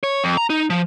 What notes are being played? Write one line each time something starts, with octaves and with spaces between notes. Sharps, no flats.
C#5
F2
A#5
D#4
F3